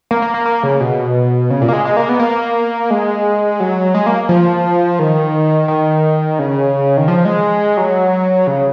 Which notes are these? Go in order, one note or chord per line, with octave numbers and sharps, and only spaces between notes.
A#3
A#3
A#3
A#3
C#3
B2
C#3
A#2
A#3
G#3
G#3
A#3
B3
A#3
G#3
F#3
G#3
A#3
F3
D#3
D#3
C#3
D#3
F3
G#3
F#3
C#3